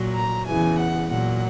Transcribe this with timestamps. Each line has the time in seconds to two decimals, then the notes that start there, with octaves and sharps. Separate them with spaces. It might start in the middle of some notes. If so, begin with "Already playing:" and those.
Already playing: A#2 F#3
0.14 A#5
0.45 E2 C#3 E3 G#5
0.77 F#5
1.09 A#2 F#3 F#5